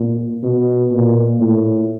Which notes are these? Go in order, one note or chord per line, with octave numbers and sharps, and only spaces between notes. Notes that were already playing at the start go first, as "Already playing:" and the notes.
Already playing: A#2
B2
A#2
A2